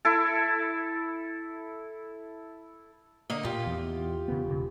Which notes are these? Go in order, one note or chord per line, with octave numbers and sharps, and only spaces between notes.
E4 A4
D3 A#3 D#5
A#2 F4 G4
E2
C#3 B3
E1 C#3